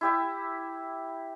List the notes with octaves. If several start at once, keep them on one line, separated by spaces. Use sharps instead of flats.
E4 G4 E5